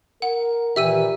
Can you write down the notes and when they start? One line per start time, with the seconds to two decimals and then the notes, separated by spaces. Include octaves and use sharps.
0.22 A#4 F#5
0.76 A#2 D#3 E3 F4 G4 E5 E6 D#7